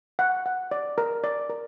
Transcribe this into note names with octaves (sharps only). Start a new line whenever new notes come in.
F#5
F#5
D5
A#4
D5
A#4